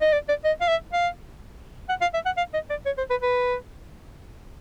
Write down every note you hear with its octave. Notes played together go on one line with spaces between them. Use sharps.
D#5
D5
D5
D#5
F5
E5
F5
F#5
F5
E5
F#5
F5
D#5
D5
C#5
C5
B4
B4